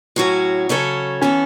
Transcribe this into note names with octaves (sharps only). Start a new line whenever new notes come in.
A2 F#3 C#4 F#4
C#3 F#3 C#4 A4 C#5
E3 B3 C#4 A4